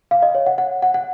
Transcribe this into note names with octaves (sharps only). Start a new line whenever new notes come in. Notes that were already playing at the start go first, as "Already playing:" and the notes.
F5
D#5
C#5
F#5
F#5
F#5
F#5